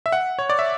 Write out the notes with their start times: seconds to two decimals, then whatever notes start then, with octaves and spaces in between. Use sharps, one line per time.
0.06 E5
0.12 F#5
0.39 C#5
0.50 D5
0.59 E5